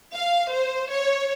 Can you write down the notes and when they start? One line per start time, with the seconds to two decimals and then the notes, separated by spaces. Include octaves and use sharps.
0.16 F5
0.53 C5
0.91 C#5